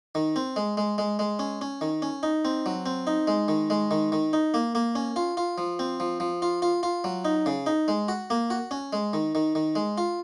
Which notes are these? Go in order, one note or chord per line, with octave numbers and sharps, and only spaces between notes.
D#3
C4
G#3
G#3
G#3
G#3
C#4
C#4
D#3
C#4
D#4
C4
F#3
C4
D#4
G#3
D#3
G#3
D#3
D#3
D#4
A#3
A#3
C#4
F4
F4
F3
C4
F3
F3
F4
F4
F4
F#3
D#4
C#3
D#4
G#3
F#4
A#3
F#4
C#4
G#3
D#3
D#3
D#3
G#3
F4